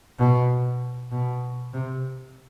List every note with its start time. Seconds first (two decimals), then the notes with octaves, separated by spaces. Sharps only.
0.19 B2
1.11 B2
1.73 C3